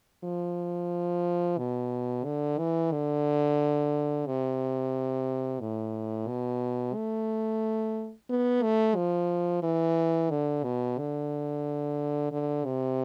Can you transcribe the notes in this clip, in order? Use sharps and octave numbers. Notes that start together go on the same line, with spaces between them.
F3
B2
D3
E3
D3
C3
A2
B2
A3
B3
A3
F3
E3
D3
B2
D3
D3
C3